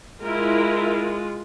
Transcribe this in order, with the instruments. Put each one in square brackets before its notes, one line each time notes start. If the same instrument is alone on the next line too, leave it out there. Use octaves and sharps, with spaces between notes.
[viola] G#3 F4 [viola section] E4 A#4